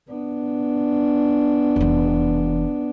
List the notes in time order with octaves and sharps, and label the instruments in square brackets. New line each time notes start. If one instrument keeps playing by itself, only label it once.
[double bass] B3 D4
[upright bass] F1 E3